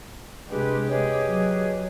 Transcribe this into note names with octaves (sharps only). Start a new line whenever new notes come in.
C3 G#3 D4 G4 B4
G#4 B4 C#5 D#5
F#3